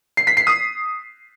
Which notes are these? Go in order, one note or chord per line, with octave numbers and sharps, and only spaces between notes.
C7
B6
C7
D#6